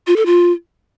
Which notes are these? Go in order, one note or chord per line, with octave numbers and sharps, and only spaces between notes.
F4
A4
F4